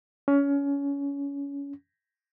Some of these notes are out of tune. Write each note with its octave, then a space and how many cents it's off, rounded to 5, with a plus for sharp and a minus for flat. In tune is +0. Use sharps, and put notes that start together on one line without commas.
C#4 +25